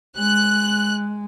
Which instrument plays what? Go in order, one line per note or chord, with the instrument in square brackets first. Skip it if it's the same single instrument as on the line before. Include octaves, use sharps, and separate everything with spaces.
[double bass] G#3 [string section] F#6